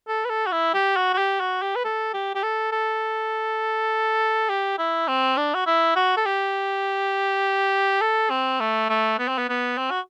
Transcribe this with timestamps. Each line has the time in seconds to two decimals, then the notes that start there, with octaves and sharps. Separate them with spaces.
0.08 A4
0.25 B4
0.30 A4
0.47 F#4
0.52 E4
0.74 G4
0.96 F#4
1.13 F#4
1.18 G4
1.40 F#4
1.62 G4
1.76 B4
1.85 A4
2.14 G4
2.35 G4
2.43 A4
2.72 A4
4.49 G4
4.78 E4
5.08 C4
5.37 D4
5.54 F#4
5.66 E4
5.96 F#4
6.17 A4
6.26 G4
8.01 A4
8.30 C4
8.60 A3
8.89 A3
9.19 B3
9.28 C4
9.38 B3
9.49 B3
9.78 C4
9.91 F#4